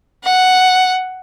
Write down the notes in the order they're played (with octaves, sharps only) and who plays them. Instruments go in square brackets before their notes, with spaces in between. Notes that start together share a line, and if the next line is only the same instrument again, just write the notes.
[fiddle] F#5